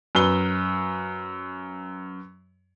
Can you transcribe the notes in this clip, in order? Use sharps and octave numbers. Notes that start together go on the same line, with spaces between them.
F#2 B4 G7